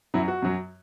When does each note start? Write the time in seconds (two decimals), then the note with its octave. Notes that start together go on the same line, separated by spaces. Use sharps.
0.14 F#2 F#3 E4
0.28 F#4
0.42 F#2 F#3